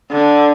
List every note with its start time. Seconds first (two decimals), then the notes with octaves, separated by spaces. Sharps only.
0.11 D3